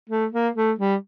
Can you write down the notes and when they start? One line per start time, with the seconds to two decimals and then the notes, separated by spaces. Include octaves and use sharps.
0.10 A3
0.33 A#3
0.56 A3
0.79 G3